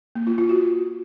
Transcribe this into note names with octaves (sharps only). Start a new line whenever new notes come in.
A#3
F4
F4
F#4